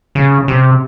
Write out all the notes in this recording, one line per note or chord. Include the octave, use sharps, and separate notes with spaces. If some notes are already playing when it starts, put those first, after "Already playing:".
C#3
C3